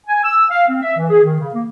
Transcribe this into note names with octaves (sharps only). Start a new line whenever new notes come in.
G#5
E6
F5
C4
E5
E3
G#4
D#3
C#3
A#3